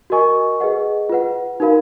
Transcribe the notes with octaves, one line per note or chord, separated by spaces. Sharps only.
F#4 A#4 D#5 G#5 C#6
G#4 B4 D#5 F#5
F4 B4 F#5
D#4 F#4 A#4 F5 B5